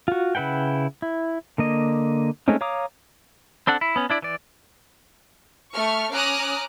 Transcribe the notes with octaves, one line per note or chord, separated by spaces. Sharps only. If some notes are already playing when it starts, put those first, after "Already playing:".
F4 F#4
C#3 E4 B4 F#5 G5
E4
D3 A#3 D#5
G#3 A3 C4 C#4 D#4
C#5 F5 A#5 D6 D#6
C4 D4 A4 F#5
E4
B3 C#4
D4 E4 D5
E3 D5
A3 C#6 F6
C#4 A#5 D6 D#6 F6 F#6